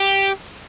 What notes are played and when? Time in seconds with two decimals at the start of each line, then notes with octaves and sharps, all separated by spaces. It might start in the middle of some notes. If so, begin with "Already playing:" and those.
Already playing: G4